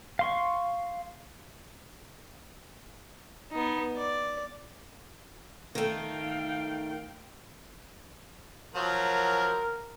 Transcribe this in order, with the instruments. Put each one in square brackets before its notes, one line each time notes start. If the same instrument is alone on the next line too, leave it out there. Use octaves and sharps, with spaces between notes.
[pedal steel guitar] F5 C6 C#6
[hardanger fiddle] B3 D#4
D5
[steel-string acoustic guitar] D#3 A3 [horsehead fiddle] F5 G5
[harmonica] F3 F#3 [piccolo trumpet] A#4